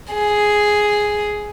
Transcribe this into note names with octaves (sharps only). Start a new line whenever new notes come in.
G#4